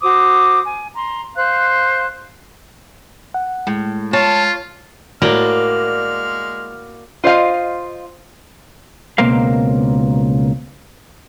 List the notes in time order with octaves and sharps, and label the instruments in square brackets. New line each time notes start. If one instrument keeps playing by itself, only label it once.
[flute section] F#4 C5 D6 D#6
G#5
A#5 C6
C5 F5 F#6
[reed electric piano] F#5
[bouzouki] A2 [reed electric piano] G#3
[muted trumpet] F4 [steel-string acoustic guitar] C#5 [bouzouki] A5
[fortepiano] A2 [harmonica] G#3 F6 [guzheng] A#3 [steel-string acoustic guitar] F#4 D5
[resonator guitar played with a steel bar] F4 C5 D#5 F5
[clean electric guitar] C#2 B2 A#3 C4 A#4 F5